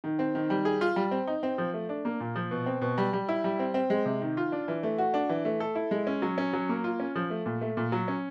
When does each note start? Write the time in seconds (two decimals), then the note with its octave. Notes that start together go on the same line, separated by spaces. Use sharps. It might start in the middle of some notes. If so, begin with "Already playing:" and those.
0.04 D#3
0.19 C4
0.35 D#3
0.50 G3
0.65 G#4
0.81 F4
0.96 G3
1.11 C4
1.27 D#4
1.43 C4
1.58 F3
1.74 A3
1.89 D4
2.05 A#3
2.20 A#2
2.36 F3
2.51 B2
2.66 C4
2.82 B2
2.98 G3
3.13 G3
3.29 E4
3.44 G3
3.59 C4
3.74 C4
3.90 G#3
4.06 C3
4.22 D#3
4.37 F4
4.52 D4
4.68 E3
4.83 A3
4.98 F#4
5.14 D4
5.29 E3
5.45 A3
5.60 A4
5.75 E4
5.91 G#3
6.07 C#4
6.22 F#3
6.38 C#4
6.53 F#3
6.69 A#3
6.84 F4
7.00 C#4
7.16 F3
7.30 A3
7.46 A#2
7.61 A3
7.77 A#2
7.92 F#3
8.08 C#4